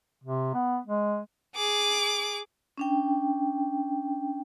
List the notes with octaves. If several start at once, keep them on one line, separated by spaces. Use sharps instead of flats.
C3
B3
G#3
G#4 D6
C#4 D4 G5